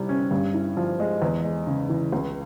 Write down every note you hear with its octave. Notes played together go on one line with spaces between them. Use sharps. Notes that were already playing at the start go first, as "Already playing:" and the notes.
Already playing: C3 G3 E4
C#4
G2
E4
F3
G#3
E2
G#3
C#3
E3
C#2